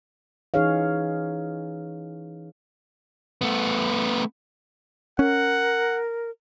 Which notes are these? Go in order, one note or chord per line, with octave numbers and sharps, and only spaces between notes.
E3 C#4 D#4 G#4 C#5 F5
A3 B3
C#4 A#4 F#5